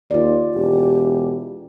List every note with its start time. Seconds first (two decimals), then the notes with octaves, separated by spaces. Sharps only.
0.11 D#2 F4 D5
0.55 E1 G4